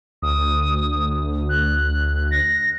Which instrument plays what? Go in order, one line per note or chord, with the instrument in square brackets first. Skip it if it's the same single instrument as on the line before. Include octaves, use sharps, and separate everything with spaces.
[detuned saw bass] D2 [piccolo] D#6
[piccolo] F#6
A#6